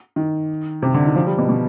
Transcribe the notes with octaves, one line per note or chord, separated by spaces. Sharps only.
D#3
C3
D3
D#3
F3
G3
B2
B2